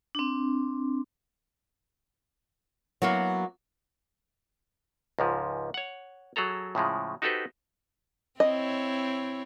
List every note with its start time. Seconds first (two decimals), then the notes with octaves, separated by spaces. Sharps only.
0.15 C4 D4
3.02 F#3 A#3 B3 E4 F#4 C#5
5.19 C#2 G#2 F3
5.74 C#5 F#5
6.36 F#3 G#4 A4 A#5
6.75 A2 C#3 F3 G#3
7.22 D#4 F#4 G4 A4 B4 C5
8.40 C4 E4 C#5 D#5